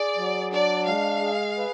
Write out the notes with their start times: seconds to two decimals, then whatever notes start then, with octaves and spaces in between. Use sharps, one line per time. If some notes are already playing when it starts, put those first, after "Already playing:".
Already playing: G#4 D5
0.17 F#3
0.52 D4 D5
0.86 G#3 F5
1.22 G#4
1.58 B4